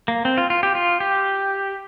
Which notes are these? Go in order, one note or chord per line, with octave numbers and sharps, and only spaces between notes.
A#3
C4
F4
F4
G4
F4
G4